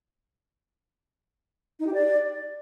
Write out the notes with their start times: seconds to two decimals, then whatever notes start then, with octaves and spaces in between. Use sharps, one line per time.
1.80 D#4
1.87 G4
1.94 D5